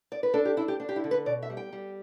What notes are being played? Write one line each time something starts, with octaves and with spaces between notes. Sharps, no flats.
D5
B4
D4 A4
G4
D4 E4
G4
D4
G4
E4
D3
B4
B2 D5
E5
G3
G5
G3